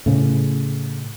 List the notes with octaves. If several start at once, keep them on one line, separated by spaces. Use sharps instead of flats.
A2 C#3